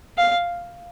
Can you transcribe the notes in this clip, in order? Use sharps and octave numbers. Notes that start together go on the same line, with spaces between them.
F5